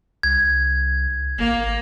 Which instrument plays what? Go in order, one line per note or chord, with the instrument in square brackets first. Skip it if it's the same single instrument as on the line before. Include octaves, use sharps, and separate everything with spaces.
[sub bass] C2 [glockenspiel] G#6
[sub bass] G#1 [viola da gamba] A#3